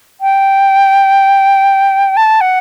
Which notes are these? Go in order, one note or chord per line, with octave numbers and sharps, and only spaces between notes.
G5
A5
F#5